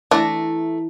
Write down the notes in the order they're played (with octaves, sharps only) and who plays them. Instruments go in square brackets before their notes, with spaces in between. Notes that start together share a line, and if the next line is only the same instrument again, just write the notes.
[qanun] E3 A#5 [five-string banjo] A3 [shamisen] D4